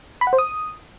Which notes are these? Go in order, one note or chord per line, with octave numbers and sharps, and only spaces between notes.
B5
F#5
C5
D#6